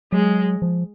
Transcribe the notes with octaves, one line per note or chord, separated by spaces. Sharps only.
F#3 G#3
F3